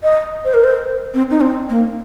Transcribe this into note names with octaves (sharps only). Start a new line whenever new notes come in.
D#5
C5
A#4
C5
C4
D#4
C4
A#3